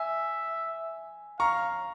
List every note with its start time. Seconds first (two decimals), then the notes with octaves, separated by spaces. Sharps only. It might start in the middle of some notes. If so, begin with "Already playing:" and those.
Already playing: E5 G#5
1.39 F5 A#5 C#6